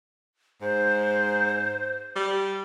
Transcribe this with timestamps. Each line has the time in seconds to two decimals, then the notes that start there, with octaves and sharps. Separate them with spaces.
0.62 G#2 C5
2.16 G3